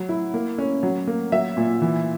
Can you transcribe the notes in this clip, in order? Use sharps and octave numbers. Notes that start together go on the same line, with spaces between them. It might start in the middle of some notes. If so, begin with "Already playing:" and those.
Already playing: F#3
E4
A#3
C#4
F#3
A#3
F#3 E5
A#2
E3